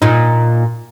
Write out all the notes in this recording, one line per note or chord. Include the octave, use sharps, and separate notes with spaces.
A#2 D#4